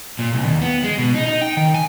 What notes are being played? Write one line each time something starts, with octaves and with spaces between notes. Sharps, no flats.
A#2
C2
D#2
B3
G#3
B2
D#4
D#4
G5
D#3
G#5